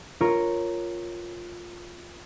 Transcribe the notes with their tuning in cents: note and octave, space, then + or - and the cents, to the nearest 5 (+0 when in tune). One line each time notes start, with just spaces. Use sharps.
F4 +5 A#4 +0 C#5 -5